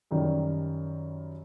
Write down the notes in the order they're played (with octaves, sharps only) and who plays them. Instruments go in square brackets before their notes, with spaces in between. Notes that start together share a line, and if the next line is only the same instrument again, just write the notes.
[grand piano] F#2 D#3 G3